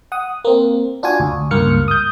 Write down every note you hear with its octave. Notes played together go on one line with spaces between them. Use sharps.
F#5 D#6
A#3 C4
D4 F4 F#4 G#5
D2
C#2 G2 A#3 F6 C#7
D#6 G6